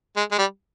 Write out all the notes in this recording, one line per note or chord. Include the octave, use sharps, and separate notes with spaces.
G#3
G#3
G3